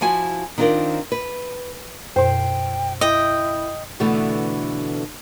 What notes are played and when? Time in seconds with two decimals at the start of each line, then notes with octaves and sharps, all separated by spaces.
0.01 F3 E4 F#4 G#5
0.58 D#3 C4 D4 F4 A#4
1.12 B4
2.16 F#2 B2 C5 G5
3.01 E4 D#5 G5
4.00 B2 D3 E3 A3 B3